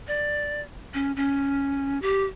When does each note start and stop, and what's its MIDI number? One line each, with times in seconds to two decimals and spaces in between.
0.08 0.62 74
0.94 1.12 61
1.16 2.00 61
2.02 2.24 67